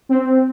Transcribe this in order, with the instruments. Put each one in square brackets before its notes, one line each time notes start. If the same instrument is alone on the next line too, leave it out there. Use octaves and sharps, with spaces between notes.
[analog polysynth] C4